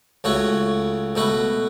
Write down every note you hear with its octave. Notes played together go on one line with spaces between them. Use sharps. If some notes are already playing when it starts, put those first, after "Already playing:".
C#2 C#3 A3 F#4 C#5
B2 A3 F#4 B4